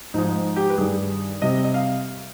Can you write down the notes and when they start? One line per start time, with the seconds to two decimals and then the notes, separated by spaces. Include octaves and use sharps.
0.14 G#2 F3 G#3 D#4
0.56 G4
0.70 B4
0.78 G2 D#3 G3 G#4
1.42 C3 G3 D#5
1.64 D#5
1.74 F5